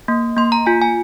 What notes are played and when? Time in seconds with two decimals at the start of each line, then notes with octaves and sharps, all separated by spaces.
0.08 A#3
0.37 A#3 C6
0.52 A#5
0.66 F4 G#5
0.82 G#5